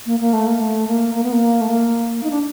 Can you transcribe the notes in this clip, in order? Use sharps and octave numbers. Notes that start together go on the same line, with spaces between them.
A#3
A#3
A3
A#3
A3
A#3
A#3
B3
A#3
A3
A#3
D#4
D4